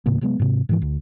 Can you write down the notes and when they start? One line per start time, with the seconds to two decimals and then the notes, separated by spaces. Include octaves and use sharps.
0.06 D#1 A2 C#3 A#3
0.21 C3 F#3 G#3 B3
0.40 G#2 C3
0.69 G#2 D#3 E3
0.82 D2